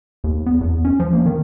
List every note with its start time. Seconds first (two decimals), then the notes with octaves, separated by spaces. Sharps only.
0.24 D#2
0.46 B3
0.61 E2
0.85 C#4
1.00 F3
1.13 A#3
1.26 D#3